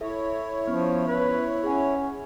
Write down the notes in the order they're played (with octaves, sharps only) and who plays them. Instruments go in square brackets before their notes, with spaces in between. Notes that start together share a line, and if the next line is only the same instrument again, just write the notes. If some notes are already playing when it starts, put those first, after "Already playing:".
[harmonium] E4 C#5 [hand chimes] A4 E5
[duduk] F3 [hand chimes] B3 C#4
[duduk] B4
[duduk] C#4 [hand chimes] G#4 F#5